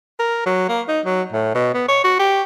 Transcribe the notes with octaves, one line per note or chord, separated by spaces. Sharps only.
A#4
F#3
A#3
D#4
F#3
A2
B2
B3
C#5
F#4
G4